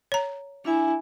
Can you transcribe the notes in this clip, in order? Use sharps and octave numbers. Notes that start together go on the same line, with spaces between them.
C#5 A#5
D4 E4 E5 G#5